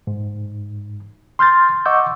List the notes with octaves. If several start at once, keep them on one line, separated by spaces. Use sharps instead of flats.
G#2
C6 F6 G6 A6
D#5 F#5 C#6 D6 E6 G6